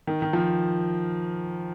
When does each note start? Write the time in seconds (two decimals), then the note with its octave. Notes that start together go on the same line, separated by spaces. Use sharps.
0.07 D#3
0.22 D#3
0.33 F3